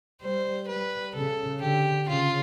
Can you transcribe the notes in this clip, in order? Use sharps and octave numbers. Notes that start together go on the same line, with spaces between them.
G3 C5
G3 B4
C#3 A4
D3 G4
C#3 F4